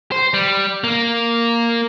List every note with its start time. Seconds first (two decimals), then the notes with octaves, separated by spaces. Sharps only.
0.12 C5
0.34 G3
0.84 A#3